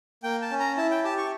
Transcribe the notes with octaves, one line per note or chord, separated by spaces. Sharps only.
A#3 G5
A5
C#4
A#5
E4 A5
G5
G4 A5
C#6